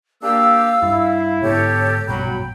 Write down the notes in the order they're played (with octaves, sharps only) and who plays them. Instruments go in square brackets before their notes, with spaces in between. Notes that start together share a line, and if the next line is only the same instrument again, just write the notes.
[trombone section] A#3 D4 G4 [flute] F5 [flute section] E6
[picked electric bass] G2 [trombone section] E4
[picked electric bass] G#2 D3 B3 [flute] G4 [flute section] A4 C#5
[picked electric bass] A#1 G2 B2 [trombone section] F#3 [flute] G5 [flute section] B5